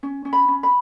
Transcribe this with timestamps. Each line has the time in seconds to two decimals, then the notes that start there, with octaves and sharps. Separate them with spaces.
0.03 C#4
0.25 C#4
0.33 B5
0.48 C#4
0.63 B5